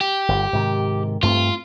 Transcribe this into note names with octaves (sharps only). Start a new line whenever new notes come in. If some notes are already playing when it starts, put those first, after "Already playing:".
G4
G1
G#2 C3 D#3
G2 A3 C4 F4